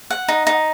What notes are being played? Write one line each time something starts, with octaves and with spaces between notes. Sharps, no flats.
F#5
D#4
D#4